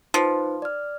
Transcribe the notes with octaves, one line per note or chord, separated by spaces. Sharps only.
F3 D#4 B4 C5
D5 F6